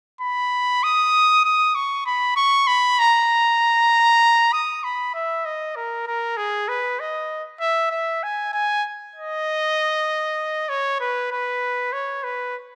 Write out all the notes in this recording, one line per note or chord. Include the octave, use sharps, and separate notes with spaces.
B5
D#6
D#6
C#6
B5
C#6
B5
A#5
D#6
B5
E5
D#5
A#4
A#4
G#4
B4
D#5
E5
E5
G#5
G#5
D#5
C#5
B4
B4
C#5
B4